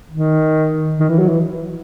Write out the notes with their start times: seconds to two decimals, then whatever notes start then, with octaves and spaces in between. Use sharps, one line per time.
0.11 D#3
0.99 D#3
1.09 E3
1.19 F#3
1.29 E3